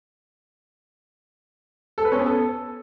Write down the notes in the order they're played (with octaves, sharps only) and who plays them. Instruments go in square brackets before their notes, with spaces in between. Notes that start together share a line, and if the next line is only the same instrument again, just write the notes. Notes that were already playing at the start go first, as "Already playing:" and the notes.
[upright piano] A4
B4
C#4
B3
A4